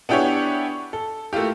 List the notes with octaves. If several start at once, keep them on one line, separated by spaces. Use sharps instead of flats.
B3 D4 E4 G4 G#4 C#5
A4
A3 A#3 E4 F4 G4